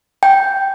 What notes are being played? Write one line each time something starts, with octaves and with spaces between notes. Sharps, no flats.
G5